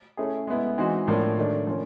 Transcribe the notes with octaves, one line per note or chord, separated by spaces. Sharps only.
A3 C#4 E4 G#4
G#3 B3 E4
E3 G#3 C4 D#4 F#4
A2 F3 A#3 D4
D#3 F#3 A3 D4
F3 A#3 C#4